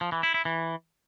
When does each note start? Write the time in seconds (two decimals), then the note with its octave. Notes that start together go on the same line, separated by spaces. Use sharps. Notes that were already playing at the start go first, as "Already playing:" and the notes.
0.01 F3
0.12 E3
0.23 E4
0.34 E4
0.45 E3